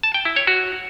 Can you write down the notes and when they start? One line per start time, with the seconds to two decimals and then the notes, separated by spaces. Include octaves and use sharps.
0.03 A5
0.14 G5
0.25 E4
0.36 C#5
0.47 F#4